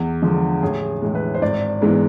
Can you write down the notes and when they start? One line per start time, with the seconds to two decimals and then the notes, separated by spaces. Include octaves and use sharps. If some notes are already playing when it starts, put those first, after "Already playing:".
Already playing: E2
0.22 D3 F3 G#3
0.62 A1 G#4
1.02 A2 E3 G#3
1.15 B4
1.34 C5
1.42 G#1 D5
1.81 G#2 E3 G#3 B3